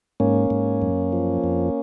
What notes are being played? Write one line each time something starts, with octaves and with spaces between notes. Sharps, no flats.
G#2 A#3 C#4
G#2
F#2
F3
F2